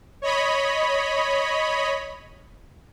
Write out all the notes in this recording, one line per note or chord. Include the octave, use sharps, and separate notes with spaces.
C#5 D#5 B5